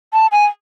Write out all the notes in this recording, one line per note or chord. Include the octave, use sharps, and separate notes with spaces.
A5
G#5